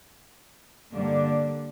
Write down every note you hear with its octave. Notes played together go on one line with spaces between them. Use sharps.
G2 D3 G3 A#3 D4